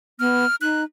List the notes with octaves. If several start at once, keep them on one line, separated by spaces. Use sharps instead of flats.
B3 F6
D#4 F#6